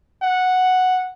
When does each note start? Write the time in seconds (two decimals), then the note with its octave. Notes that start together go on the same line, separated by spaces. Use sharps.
0.23 F#5